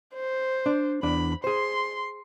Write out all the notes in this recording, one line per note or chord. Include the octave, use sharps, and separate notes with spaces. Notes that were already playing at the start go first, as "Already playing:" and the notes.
C5
D4
E2 D4 B5
G#4 C5 C6